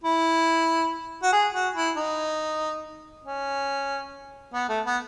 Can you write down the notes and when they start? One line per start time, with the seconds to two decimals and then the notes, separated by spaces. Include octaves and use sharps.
0.04 E4
1.23 F#4
1.33 G#4
1.54 F#4
1.76 E4
1.97 D#4
3.25 C#4
4.54 B3
4.69 A3
4.86 B3